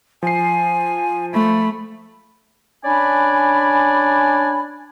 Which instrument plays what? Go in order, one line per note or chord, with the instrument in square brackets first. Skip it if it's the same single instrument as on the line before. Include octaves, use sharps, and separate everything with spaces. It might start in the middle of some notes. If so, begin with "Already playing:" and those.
[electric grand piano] F3 C7 [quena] G#5
[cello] A3 [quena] B5
[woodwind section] C#4 D4 D5 G#5 B5